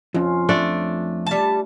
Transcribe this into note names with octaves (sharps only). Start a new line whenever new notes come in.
F2 C#4 F4
A3 D4 D5
G3 A5